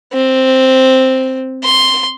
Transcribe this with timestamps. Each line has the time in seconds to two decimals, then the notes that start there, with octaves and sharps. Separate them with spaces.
0.13 C4
1.64 C6